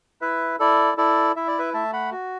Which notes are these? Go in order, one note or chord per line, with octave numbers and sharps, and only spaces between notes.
E4 B4 E5
E4 A4 D5
E4 A4 D5
E4 E5
D5
B4 E5
A3 E5 A5
F#5 B5
F#4